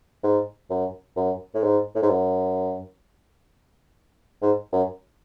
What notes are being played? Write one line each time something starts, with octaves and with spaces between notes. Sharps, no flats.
G#2
F#2
F#2
A2
G#2
A2
G#2
F#2
G#2
F#2